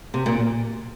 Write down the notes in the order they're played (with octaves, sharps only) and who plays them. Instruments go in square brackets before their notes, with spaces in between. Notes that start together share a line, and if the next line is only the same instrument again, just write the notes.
[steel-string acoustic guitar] C3
A#2